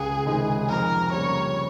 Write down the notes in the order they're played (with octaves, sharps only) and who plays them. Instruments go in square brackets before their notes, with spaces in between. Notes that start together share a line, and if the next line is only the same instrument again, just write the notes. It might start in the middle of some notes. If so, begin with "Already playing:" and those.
Already playing: [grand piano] C#2 [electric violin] G#4
[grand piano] C3 D#3 G#3 D#4
[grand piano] F2 [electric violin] A#4
[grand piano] C#3 G3 A#3 [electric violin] C#5